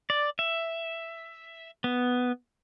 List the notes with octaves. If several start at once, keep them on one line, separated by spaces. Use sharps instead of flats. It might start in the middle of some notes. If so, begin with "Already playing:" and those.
D5
E5
B3